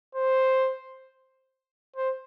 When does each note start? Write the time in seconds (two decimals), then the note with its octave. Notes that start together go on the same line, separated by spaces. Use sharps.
0.15 C5
1.96 C5